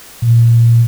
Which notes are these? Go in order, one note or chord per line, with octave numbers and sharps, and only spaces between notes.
A#2